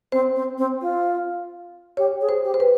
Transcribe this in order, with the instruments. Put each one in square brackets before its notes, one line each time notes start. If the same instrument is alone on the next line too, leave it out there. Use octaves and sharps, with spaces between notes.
[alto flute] C4 [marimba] C5
[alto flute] C4
C4
F4
[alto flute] G4 [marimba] C#5
[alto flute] G#4
[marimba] C5
[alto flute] G4
[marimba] C5
B4